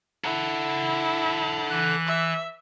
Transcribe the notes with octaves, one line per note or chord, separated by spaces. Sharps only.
E4 A4 F#5
E3 F#6
E5